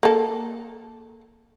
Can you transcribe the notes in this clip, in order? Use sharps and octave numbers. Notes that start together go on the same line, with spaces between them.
A#3 A4